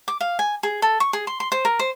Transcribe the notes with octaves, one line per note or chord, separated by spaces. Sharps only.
D6
F5
G#5
G#4
A4
C#6
G#4
C6
C6
C5
A#4
C5